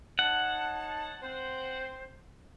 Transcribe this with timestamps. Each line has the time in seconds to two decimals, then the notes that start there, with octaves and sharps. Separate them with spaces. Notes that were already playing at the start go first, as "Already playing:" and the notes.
0.19 D#4 C#5 F#5 A5
1.23 C4 C5